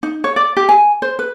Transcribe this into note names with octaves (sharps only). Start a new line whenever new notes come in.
D#4
C#5
D5
G4
G#5
C5
B4